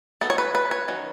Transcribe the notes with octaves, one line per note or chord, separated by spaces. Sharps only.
F#3 B3 D#4 A4
C#5
B4
B4
C#5
D#3 F#3 C#4